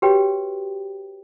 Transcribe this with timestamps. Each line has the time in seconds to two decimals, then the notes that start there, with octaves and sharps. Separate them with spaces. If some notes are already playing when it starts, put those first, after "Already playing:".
0.02 F#4 G4 B4 C#5 G5